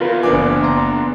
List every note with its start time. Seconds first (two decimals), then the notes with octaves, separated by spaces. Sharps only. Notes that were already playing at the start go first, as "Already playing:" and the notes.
0.01 E2 F4 A#4 B4
0.23 F#1 D4 G#5 D6
0.63 A#5 C6